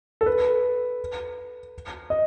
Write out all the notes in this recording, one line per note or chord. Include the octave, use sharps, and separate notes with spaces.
A4
B4
D#5